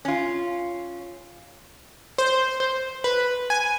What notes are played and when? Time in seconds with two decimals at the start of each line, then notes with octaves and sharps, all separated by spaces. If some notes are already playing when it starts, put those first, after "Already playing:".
0.05 C#4 F4
2.18 C5
2.60 C5
3.04 B4
3.50 G#5